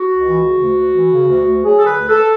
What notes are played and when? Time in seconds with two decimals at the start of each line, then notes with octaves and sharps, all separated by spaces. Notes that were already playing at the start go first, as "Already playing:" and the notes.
Already playing: F#4
0.10 C#2
0.27 E3
0.44 C#3
0.60 D2
0.78 D2
0.95 E3
1.12 C#3
1.29 D2
1.45 D2
1.63 F#3 G#4
1.79 D3 A4
1.86 B4
1.97 D2
2.09 A4